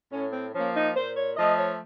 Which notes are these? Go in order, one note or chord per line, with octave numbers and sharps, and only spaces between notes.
A2 C#4
C4
F3 A#3 C#4
D#4
A#2 C5
C#5
F3 A3 D#5
C#5